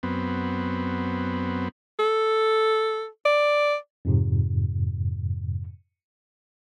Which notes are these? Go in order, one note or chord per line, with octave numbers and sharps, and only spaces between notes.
F#2 B3 C4
A4
D5
F2 G#2 C3